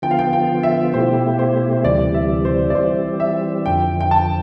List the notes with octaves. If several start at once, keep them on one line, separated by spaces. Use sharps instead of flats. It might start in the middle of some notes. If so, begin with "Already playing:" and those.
D3 F3 B3 F4 G5
F5
G5
G5
E5
B2 A3 E4 G4 C5
C5
C5
D2 C3 E3 G3 D5
E5
C5
D5
E3 G3 C4 C5
E5
F2 D3 F3 G5
G5
A5